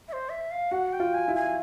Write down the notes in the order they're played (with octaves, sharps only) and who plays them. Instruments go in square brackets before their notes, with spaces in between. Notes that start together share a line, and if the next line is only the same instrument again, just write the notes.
[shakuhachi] E5
C5
E5
F5
[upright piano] F#4 [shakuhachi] F#5
[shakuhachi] G5
[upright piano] F4
[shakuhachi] G#5
[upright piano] E4
[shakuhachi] G#5